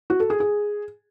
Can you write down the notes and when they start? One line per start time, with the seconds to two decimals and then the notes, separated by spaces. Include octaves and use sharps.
0.10 F#4
0.20 A4
0.30 G#4
0.40 G#4